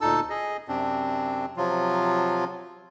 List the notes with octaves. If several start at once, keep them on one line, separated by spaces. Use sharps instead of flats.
D2 A#2 D#4 A4 A5 E6
G#4 D#5
F#2 C3 C4 D4
C3 F3 F#3 F4